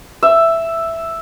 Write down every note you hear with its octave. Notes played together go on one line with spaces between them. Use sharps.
E5